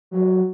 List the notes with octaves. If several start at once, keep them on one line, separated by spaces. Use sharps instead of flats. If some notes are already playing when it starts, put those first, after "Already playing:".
F#3